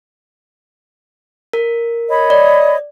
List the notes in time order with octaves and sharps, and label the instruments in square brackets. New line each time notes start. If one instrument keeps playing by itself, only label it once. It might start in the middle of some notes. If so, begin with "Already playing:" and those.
[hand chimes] A#4
[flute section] C#5 D#5 B5
[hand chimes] D5